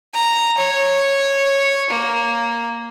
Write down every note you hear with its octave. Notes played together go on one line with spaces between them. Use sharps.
A#5
C#5
A#3